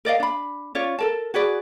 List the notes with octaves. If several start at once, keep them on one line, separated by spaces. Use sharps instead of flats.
A#4 D5 D#5 F5
D4 B5
C#4 F4 C#5 D5
A4 A#4 A5
F#4 G#4 B4 D5